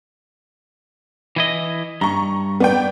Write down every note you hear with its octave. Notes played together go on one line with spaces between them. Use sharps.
E3 E4 D#5
G2 A#5 C#6
B3 D5 G5